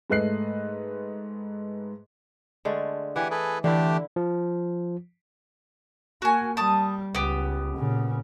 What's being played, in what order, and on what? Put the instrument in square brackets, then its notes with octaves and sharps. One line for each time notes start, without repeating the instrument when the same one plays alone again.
[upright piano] G#2 A3 B4 D#5 F#6 C7
[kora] D3 G#3 A3
[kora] E3 [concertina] G4 F#5 G#5
[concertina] G#4 A4 B4
[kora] D3 E4 [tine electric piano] E3 [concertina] A3 D4 G4
[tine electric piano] F3
[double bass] A#3 [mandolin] F#4 G#5
[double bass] G3 [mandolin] A5 D#6
[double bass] C#2 [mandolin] B3 G4
[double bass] A#2 C#3